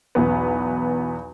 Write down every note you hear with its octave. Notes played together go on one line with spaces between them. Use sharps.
B1 E2 B3